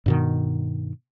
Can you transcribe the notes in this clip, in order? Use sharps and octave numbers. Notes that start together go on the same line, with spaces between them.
G2 B2 D#3